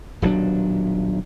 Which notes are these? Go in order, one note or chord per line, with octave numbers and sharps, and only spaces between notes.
D#1 B1 F#3 D4